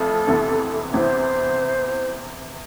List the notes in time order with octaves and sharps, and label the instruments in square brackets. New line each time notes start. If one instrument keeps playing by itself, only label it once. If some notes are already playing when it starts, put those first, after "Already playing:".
Already playing: [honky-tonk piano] F2 E3 A3 [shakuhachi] A4
[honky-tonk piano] E2 C3 E3 B3
[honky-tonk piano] E2 C3 E3 B3 [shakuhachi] C5